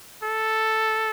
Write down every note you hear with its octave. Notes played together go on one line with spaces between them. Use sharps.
A4